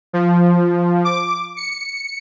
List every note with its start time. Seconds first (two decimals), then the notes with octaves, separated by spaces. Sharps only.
0.13 F3
1.05 D6
1.57 C#7